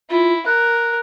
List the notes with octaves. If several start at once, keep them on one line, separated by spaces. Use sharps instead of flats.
E4 F4
A#4 F#6